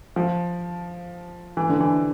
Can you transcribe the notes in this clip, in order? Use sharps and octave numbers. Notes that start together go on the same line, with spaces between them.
F3
E3
D3
E3